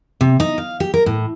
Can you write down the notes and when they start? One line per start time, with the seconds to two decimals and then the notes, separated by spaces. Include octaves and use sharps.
0.21 C3
0.40 D#4
0.58 F5
0.80 G4
0.94 A#4
1.06 A2